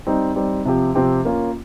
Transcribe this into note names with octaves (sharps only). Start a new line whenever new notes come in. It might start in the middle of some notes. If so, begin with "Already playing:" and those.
G3 C4 D#4
G3 C4 D#4
C3 F3 C4 G4
C3 F3 C4 G4
A#3 C#4 F4